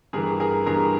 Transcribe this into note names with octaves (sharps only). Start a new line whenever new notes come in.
G2 E3 G#4 A#4
G#4 A#4
G2 E3 G#4 A#4